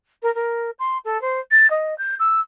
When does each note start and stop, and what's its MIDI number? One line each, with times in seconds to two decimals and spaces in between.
0.22 0.33 70
0.35 0.70 70
0.79 0.98 84
1.05 1.20 69
1.21 1.40 72
1.51 1.69 93
1.70 1.97 75
1.98 2.15 91
2.19 2.40 88